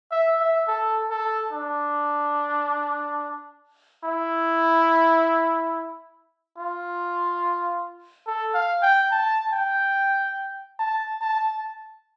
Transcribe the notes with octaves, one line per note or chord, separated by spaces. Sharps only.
E5
E5
A4
A4
D4
E4
F4
A4
F5
G5
A5
G5
A5
A5